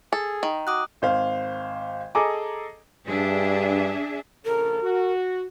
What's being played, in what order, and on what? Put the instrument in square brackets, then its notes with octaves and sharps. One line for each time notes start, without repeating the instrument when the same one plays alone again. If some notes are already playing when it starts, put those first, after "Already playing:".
[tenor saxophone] G#4 [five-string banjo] A4
[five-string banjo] D#3
[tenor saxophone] F#4 [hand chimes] D6 D#6 F#6
[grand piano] G#1 C5 F5
G#4 A4 D#5 G#5 A#5 D6
[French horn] G2 [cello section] D4 G#4 E5
[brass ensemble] A#1 C#3 A4 [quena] A#4
[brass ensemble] F#4